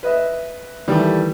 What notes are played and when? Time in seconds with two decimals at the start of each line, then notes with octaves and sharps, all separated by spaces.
0.03 B4 D#5 E5
0.88 D#3 E3 G3 A3